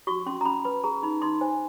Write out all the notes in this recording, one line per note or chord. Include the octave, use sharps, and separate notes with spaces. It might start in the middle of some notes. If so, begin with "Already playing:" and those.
F#4 C#6
C#4 C6
A#5
C#4 B5
B4 B5
G#4 A#5
D#4 B5
D#4 C6
C5 G#5